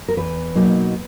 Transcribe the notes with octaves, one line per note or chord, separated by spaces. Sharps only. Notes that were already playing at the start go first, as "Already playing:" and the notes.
A#4
E2 B4
B2 F#3 A#3 D#4